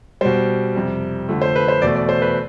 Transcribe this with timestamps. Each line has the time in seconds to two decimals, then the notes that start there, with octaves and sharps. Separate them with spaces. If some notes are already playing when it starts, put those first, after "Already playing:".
0.21 B2 G3 C5
0.75 F2 C3 G3
1.29 F2 D3 F3 A3
1.42 C5
1.56 B4
1.68 C5
1.82 E2 B2 A3 D5
1.95 D5
2.09 C5
2.22 B4